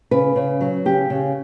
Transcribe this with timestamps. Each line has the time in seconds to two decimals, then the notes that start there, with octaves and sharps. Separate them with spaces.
0.11 C#3 B4
0.36 C#3
0.61 F#3
0.85 C#3 G4
1.10 C#3